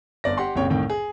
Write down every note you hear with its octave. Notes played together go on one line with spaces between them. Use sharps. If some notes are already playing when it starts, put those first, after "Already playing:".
G1 D5 A#6
G4 F#5 C6
F#1 C2 A#2 C#3 C#5 G5
C2 A2 D#3 G5
G#4